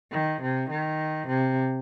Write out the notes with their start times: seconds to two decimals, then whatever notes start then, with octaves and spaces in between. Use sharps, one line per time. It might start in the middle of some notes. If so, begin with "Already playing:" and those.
0.12 D#3
0.42 C3
0.70 D#3
1.28 C3